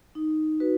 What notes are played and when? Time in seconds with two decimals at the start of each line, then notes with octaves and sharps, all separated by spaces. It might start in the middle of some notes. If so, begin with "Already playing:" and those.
0.15 D#4
0.60 F#4 B4